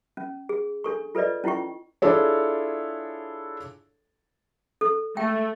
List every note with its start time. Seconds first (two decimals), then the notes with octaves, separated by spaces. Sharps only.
0.17 C#4
0.49 G#4
0.84 D4 A4 C#6
1.15 F4 A4 B4 D5 D#5
1.44 C#4 E4 F4 G5 C#6
2.02 D4 E4 F4 G#4 A4 C#5
4.81 A4
5.17 A3 G5